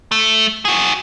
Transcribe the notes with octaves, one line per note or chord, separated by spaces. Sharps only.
A3
F#4 G#4